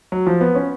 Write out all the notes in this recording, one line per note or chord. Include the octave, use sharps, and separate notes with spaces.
F#3
F3
B3
C#4